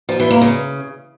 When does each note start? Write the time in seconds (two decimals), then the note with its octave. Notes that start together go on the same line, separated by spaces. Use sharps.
0.09 F3
0.20 E3
0.31 A#3
0.41 C#3